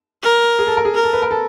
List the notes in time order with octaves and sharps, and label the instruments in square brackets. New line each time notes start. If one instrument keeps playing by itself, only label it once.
[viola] A#4
[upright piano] G#4
A4
A#4
G#4
[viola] A#4
[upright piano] A4
B4
A#4
A4